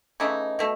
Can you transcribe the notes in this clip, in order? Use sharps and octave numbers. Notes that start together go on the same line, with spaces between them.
C#3 E3 A3 D#4
B2 A3